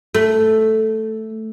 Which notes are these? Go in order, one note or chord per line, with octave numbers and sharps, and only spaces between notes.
A3